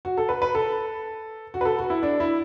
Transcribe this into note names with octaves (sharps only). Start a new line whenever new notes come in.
F#4
A4
B4
B4
A4
F#4
B4
A4
F#4
E4
D4
E4